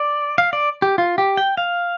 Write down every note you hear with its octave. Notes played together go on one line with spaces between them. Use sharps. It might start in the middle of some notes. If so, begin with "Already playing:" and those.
Already playing: D5
F5
D5
G4
F4
G4
G5
F5